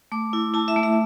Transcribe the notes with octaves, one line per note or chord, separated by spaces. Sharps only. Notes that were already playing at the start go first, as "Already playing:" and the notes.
A3 D6
E4
E4 A5
E5
A3
E5